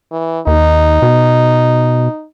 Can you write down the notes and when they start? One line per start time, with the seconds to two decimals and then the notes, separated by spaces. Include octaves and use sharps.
0.11 E3
0.47 D#2 D#4
1.02 B2